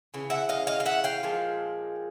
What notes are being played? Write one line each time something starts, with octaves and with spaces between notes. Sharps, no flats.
C#3 E3
E5 F#5
D#5 F5
D#5 F5
F5
E5 F#5
F5 G5
A#2 F3 G#3